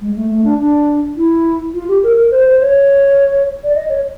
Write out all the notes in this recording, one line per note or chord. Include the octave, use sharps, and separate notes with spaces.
G#3
A3
A3
D4
D4
E4
F4
G4
A#4
A#4
C5
C5
C#5
D5
D#5
C#5